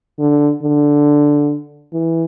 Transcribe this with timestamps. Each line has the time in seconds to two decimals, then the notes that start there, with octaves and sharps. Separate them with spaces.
0.19 D3
0.63 D3
1.93 E3